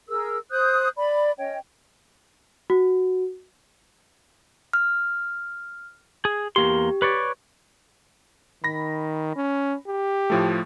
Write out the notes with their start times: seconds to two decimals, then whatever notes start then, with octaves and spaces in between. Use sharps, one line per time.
0.09 G#4 A#4 E6
0.51 C5 D#6 F#6 G6
0.97 D5 B5
1.38 C#4 C#5 D#5 G5
2.70 F#4
4.73 F6
6.25 G#4
6.56 E2 A#3 G4 C6
7.02 B4 C#5 D5
8.64 D#3 B5 A#6
9.36 C#4
9.88 G4
10.30 A2 F3 A3